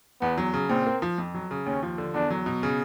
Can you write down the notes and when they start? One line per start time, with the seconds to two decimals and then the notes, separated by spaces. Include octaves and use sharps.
0.22 E2 B3
0.38 F#3
0.54 C#3
0.69 A#2 C4
0.86 A#3
1.02 F3
1.18 F2
1.34 F#3
1.51 C#3
1.66 D#2 C#4
1.83 F3
1.98 D3
2.14 E2 D4
2.30 F#3
2.46 B2
2.63 C#3